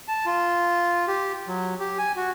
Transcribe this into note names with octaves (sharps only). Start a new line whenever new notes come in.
A5
F4
G4
F#3
G4
G#5
F#4